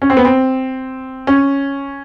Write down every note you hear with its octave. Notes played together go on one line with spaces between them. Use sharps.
C#4
C4
B3
C4
C#4